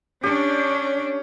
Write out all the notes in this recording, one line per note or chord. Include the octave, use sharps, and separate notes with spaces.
C#4 D4 G4 C#5